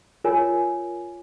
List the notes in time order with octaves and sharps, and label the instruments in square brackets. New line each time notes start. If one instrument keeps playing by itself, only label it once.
[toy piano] F4 A#4 C#5 G#5